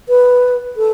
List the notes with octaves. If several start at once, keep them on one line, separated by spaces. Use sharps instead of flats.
B4
A4